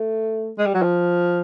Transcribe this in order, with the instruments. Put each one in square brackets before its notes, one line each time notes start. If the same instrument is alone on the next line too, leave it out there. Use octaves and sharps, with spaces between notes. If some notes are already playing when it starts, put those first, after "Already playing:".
Already playing: [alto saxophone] A3
G#3
G3
F#3
F3